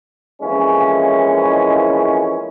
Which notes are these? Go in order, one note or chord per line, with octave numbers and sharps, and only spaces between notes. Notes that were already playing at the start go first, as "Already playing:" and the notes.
F2 E3 G#3 A#3 C#4 E4